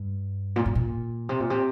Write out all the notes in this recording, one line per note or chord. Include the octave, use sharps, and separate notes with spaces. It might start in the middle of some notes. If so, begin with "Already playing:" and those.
Already playing: G2
A#2
G2
A#2
C3
A#2
C3